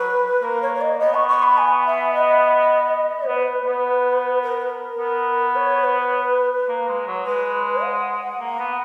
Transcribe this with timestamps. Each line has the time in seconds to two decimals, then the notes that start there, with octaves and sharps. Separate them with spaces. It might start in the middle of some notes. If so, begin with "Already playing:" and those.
Already playing: F#3 B4
0.42 A#3 A#4
0.62 C#5
0.74 C#5
0.81 D#5
1.00 B3 D#5
1.14 C#6
1.28 C#6
1.42 B5
1.57 G#5
1.85 E5
2.13 D#5
3.27 B3 B4
3.66 B3
4.41 A#4
4.61 B4
4.69 A#4
4.98 B3
5.55 C#5
5.83 B4
6.68 A#3
6.88 G#3
7.07 F#3
7.26 G#3 B4
7.83 F#5
8.40 A#3
8.59 B3